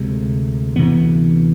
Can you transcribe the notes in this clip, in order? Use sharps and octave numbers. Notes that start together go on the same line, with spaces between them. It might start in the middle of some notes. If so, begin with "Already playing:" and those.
Already playing: D2 C3 G#3
D2 C3 E3 B3